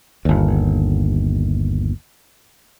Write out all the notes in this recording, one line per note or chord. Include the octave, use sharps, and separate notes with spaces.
G1 D#2